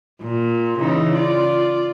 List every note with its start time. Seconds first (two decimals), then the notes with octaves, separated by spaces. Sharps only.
0.22 A#2
0.79 C#3 E3 D#4
1.15 F4 D5